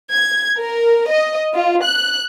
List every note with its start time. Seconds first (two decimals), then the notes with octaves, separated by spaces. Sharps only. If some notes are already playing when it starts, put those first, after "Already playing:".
0.12 G#6
0.60 A#4
1.10 D#5
1.54 F4
1.83 F#6